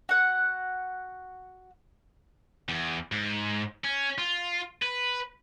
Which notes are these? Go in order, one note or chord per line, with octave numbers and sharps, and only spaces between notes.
F#4 F#5
E2
G#2
C#4
F4
B4